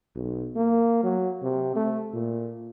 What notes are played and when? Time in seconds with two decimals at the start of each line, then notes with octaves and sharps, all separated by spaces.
0.15 B1
0.56 A#3
1.04 F#3
1.42 C3
1.76 A3
2.13 A#2